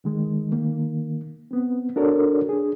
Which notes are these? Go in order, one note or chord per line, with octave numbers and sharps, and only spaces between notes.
C#2 D#3 G#3
D#3 A#3
B3 C4
D4 F#4 A4 A#4 C#5 D5
D4 G#4